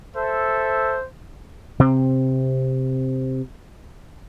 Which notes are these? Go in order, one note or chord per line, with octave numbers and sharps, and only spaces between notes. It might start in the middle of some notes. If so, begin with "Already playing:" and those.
A4 C5 E5
C3 C4